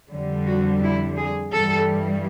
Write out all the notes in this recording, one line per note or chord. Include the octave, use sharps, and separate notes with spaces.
F2 D3 G3
F#4
E4
G#4
G2 E3 G3 A4